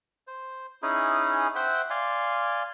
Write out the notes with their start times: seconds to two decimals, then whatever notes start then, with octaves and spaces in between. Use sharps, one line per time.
0.27 C5
0.82 C#4 D#4 E4 G#4
1.55 C5 E5 F#5 G5
1.90 D5 F5 G#5 C6